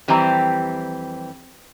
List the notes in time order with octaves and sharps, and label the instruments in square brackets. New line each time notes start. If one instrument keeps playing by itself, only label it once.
[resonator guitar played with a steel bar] F2 E3 G3 C4 G4 A#5